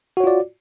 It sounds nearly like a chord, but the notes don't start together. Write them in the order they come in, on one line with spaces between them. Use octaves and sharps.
F#4 C#5 F4 D5